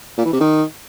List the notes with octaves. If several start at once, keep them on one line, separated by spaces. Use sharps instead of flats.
A#2
E3
C3
D#3